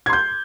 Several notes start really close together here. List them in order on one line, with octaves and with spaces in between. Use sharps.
G#6 C6 G6